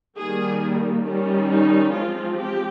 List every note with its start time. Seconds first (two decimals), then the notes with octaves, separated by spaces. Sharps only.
0.18 D#3 G3 A#3 G#4
1.05 D#3 G3 C#4
1.49 D#4
1.91 F3 G#3 C4 F4
2.35 G4